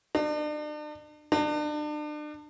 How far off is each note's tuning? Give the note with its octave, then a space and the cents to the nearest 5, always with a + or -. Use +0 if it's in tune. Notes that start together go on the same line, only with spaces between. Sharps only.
D4 +40
D4 +35